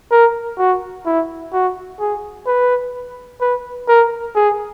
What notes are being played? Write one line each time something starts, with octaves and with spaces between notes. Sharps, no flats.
A#4
F#4
E4
F#4
G#4
B4
B4
A#4
G#4